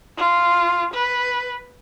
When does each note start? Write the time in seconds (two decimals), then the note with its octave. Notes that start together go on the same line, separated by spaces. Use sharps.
0.18 F4
0.94 B4